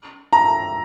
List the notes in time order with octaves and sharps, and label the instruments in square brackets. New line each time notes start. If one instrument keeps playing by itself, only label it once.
[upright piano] A#5